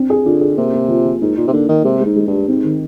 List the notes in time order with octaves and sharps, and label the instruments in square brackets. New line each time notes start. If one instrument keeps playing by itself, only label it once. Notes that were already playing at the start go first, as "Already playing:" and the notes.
Already playing: [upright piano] C4 D4
G#4
[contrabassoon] D3 [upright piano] F4
[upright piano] G#4
[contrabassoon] C3 [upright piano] A#3
[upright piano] A#3
F3
F3
[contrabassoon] G#2 [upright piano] A#3
[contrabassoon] A#2 [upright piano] D#4
[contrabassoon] C3
[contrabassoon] D3 [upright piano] A#3
[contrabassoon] D#3 [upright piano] A#4
[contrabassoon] C3 [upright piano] G#3
[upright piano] G#3
[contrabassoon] G#2
[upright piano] G#3
[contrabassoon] G2
[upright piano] G4
[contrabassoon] G#2 [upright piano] C4
[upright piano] D#3